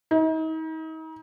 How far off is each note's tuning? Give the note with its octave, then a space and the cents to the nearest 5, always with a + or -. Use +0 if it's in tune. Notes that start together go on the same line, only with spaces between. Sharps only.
D#4 +40